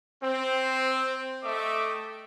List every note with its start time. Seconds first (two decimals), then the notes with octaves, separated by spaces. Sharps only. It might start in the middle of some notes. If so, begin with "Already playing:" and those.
0.23 C4
1.43 A3 D#5 E5 G5 D6